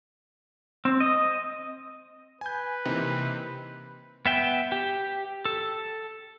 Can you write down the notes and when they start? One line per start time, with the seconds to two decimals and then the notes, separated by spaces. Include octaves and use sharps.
0.85 C4
1.00 D#5
2.41 B4 G#5 G6
2.85 C3 E3 A#3 D#4
4.26 B3 E5 G5
4.72 G4
5.45 A4